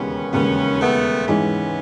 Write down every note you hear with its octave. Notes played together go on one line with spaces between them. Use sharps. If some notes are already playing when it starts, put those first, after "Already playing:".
Already playing: E1 D#2 C#3 B3 C#4
E1 D#2 C#3 B3 C#4
A3 B3
G#2 E3 G#3 B3 C#4